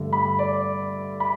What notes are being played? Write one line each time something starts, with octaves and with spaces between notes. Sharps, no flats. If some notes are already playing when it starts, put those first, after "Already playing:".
Already playing: G2 D3 A3
B5
D5
B5